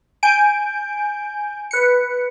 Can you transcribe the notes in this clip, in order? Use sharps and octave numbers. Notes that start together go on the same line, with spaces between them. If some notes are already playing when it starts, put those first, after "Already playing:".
G#5 G6 D7
B4 C#7